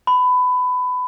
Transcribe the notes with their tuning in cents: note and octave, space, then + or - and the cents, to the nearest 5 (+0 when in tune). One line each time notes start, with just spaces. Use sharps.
B5 +20